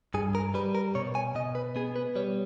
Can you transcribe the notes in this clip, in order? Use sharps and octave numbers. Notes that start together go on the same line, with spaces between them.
G2 G#4
A#4
G3 B4
A#4
B2 C#5
G#5
B2 D#5
B4
B3 G#4
B4
G3 C#5